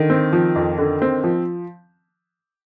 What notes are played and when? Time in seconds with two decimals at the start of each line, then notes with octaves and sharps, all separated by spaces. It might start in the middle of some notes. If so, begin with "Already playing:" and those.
Already playing: D3 D#3
0.10 C4
0.33 F3
0.56 F2
0.78 D3
1.02 C4
1.24 F3